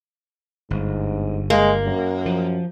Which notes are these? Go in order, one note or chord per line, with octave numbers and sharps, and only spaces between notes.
G1 G#2
G#3 A#3
F#2
F3